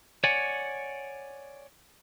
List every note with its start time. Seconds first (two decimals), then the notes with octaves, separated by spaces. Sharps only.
0.24 C#5 D5 F#5 G#5